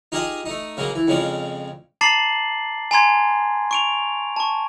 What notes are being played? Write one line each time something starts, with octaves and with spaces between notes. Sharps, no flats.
D#4 F4 G4 G#4 D#5
A3 D#4
C#3 F#3 G#3 A#3
E3
F2 C#3 F3 G#3 D5
A5 A#5 D6 A6 C7 F#7
G#5 A#5 C6 G#6
C#6 D7 F7
A5 C#6